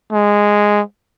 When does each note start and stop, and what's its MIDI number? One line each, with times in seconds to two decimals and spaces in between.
0.12 0.81 56